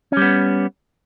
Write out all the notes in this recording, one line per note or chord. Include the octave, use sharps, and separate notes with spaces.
G3 B3 C#4